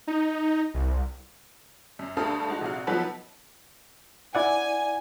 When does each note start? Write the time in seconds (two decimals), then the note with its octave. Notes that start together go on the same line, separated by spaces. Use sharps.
0.07 D#4
0.74 C2
1.99 F#2
2.17 D2 G2 A4 F5 D#6
2.48 G#3 D#4 F#4
2.61 A#1 C3 F#4 F5
2.87 F3 F#3 B3 D#4 A4 B4
4.35 E4 D5 F#5 G#5